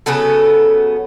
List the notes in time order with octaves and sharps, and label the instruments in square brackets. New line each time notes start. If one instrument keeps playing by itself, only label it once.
[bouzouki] C#3 F#3 B3 A4